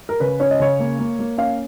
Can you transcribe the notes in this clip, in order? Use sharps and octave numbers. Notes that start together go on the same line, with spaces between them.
A#4
C#3 B4
C#4 C#5
D#5
C#3 C#5
A#3
A#3
A#3
C#4 F5